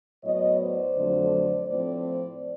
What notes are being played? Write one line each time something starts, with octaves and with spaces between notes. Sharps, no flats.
A2 F#3 B3 C#5 D#5
C5 D5
F2 D3 F#3 A3
A2 F3 A3 C4 C5 D5